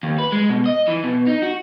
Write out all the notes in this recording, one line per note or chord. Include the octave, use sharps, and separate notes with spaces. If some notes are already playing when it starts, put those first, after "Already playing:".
D#2
B4
G#3
B2
D#5
E3
B2
D#4
F#4